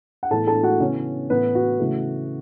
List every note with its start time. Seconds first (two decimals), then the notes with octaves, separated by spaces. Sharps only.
0.23 F#5
0.30 A2 E3 B3 A4 A5
0.47 A4 A5
0.63 F#4 F#5
0.80 C#3 E3 B3 C#4 C#5
1.30 A2 E3 A3 B3 B4
1.55 F#4
1.79 C#3 E3 A3